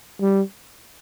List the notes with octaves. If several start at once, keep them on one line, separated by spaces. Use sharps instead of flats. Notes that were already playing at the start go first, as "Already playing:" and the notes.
G3